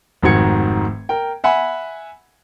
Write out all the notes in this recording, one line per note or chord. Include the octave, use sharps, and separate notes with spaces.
F1 G#2 D#3 F#4 G#6 C#7
A#4 G5
E5 F#5 G#5 B5